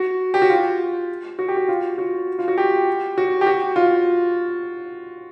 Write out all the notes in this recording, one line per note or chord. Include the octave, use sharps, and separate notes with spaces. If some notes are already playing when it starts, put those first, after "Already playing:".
Already playing: F#4
G4
F#4
F4
F#4
G4
F#4
F4
F#4
F4
F#4
G4
F#4
G4
F#4
F4